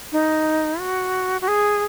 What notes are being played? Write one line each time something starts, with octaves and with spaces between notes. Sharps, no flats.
D#4
F#4
F#4
G#4